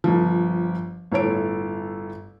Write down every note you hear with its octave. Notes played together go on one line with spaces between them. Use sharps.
G1 F3
G1 A2 A4 C#5 D7